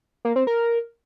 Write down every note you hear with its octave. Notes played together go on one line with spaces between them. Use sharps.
A#3
C4
A#4